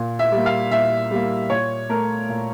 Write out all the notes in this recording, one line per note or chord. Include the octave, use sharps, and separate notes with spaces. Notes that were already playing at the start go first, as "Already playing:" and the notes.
Already playing: A#2
E5
G3
A#3
F5
A#2 E5
G3 A#3
A#2 C#5
A3 A#4
A#2